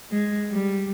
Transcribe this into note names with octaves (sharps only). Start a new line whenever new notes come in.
G#3
G3